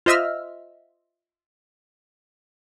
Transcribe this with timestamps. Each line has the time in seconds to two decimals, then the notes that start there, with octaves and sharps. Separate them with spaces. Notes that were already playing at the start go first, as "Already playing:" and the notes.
0.06 F4 C5 D#5 E5 E6 F6